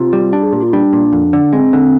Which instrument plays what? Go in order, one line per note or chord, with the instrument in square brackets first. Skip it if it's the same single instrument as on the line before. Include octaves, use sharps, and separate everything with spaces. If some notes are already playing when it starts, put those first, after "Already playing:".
Already playing: [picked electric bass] C3 [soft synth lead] F4
[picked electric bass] G3
[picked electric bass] D4 [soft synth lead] G4
[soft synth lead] G#4
[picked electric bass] A#2 [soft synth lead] G4
[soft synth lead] F4
[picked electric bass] G3 [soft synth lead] D4
[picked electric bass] A#2
F2
D3
[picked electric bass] G#3 [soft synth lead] C4
[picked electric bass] D3